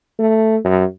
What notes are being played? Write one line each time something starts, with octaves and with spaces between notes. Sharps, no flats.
A3
F#2